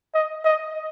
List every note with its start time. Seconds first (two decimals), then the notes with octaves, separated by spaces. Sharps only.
0.14 D#5
0.45 D#5